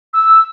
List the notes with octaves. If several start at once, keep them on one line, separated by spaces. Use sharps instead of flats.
E6